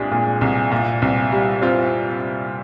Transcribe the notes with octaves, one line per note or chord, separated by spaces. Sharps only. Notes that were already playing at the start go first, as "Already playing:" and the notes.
Already playing: C2 A#2 G#3 D4 G4 G#4
A#2
C2
A#2
C2
G3
C4 F4